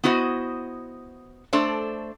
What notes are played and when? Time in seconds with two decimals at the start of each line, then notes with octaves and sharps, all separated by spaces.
0.04 B3 E4 F#4 C5 D#5
1.53 A3 D4 A4 C5 D5